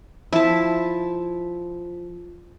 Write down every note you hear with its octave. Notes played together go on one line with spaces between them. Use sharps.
F3 E4 A5